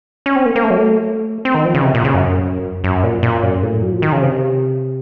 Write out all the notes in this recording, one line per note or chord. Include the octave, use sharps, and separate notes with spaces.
C#4
C4
A#3
A#3
A3
F#3
A3
C4
D#3
F3
C#3
C3
A#2
C#3
F#2
F#2
A#2
A#2
F#2
A2
F#3
F3
D#3
C#3
C3